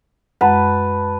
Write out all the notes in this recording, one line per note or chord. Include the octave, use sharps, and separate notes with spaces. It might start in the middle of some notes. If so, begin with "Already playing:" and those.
F#2 G#3 B4 F#5 A5